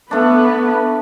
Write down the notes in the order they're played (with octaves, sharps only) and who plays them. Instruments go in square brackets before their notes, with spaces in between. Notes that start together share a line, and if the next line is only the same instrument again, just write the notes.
[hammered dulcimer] A3 D4 [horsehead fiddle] B3 B4